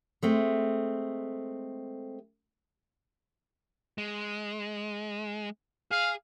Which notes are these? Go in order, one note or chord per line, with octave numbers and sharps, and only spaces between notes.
G#3 A3 C4
G#3
G#4 F5